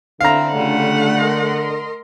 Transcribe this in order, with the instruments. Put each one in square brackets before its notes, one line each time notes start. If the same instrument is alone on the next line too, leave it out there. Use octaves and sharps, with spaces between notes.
[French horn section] D3 [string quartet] C4 E4 [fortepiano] F5 A#5
[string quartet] C#3 G3 F4 [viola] A3 F#5
[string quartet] A#4 D#5 C6